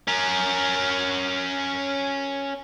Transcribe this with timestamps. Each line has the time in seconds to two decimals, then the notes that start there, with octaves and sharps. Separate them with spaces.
0.07 C#4 A#4